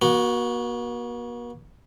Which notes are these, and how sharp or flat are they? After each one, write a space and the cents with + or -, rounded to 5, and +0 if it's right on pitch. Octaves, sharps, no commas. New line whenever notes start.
A#3 +45 F#4 +0